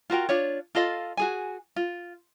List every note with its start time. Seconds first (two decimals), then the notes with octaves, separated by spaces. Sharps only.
0.10 F4 F#4 A#4 G5
0.29 D4 F4 C#5
0.75 F4 A4 D#5 F5
1.17 F#4 G#4 G#5
1.76 F4